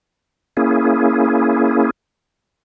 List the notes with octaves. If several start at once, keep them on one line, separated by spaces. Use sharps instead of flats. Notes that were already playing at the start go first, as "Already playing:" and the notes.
A#3 C#4 E4 G#4